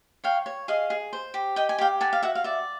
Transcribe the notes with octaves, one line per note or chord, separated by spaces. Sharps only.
C#5 F5 G5
C#5
G#4 D#5 F5
G#4
C5
G4
D#5 G5
G#5
G4 F5 G5
A4 F#5 G#5
F5
F#4 E5 F#5
F5
D5 E5